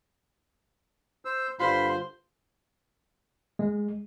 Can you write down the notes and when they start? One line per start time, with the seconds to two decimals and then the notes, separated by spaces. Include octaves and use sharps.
1.25 C5 E6
1.59 G2 D3 F4 C5 B5 C6
3.59 G#3